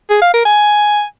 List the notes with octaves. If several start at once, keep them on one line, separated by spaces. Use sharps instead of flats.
G#4
F5
A#4
G#5